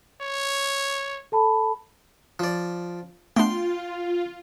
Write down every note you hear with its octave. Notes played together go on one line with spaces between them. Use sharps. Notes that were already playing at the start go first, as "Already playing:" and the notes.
C#5
A4 A5 B5
F3 D5
A3 B3 D4 F4 G5 C6